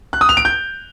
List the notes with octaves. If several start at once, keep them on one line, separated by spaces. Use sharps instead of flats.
F#6
D#6
F7
D7
G6